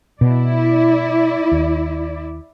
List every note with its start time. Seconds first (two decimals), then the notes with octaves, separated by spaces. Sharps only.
0.21 B2 E4 D5
1.52 D#2